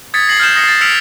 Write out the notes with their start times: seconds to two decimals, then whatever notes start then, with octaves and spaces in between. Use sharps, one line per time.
0.14 D#6 G#6 A6 B6 C#7
0.28 G#6 A#6 C7 F#7
0.40 F6 G6 E7
0.56 D#6 A#6 C7 C#7
0.68 A6
0.81 E6 F6 B6 C#7 D7 F7